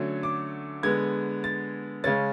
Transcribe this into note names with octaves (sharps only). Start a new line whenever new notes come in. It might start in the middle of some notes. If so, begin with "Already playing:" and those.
Already playing: D3 F#3 A3 C#4
D6
D3 G#3 B3 G#6
A6
C#3 G#3 C#4 A6